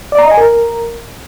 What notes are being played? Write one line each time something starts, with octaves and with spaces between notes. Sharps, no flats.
D5
A#5
D#5
G#5
A#4